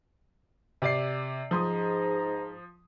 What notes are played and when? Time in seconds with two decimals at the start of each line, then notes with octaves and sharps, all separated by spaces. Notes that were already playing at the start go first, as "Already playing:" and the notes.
0.82 C3 D5 C7
1.51 G#2 F3 A#5 C6 D#6